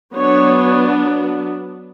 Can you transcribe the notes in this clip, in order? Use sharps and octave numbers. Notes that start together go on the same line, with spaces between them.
F#3 B3 D4 C#5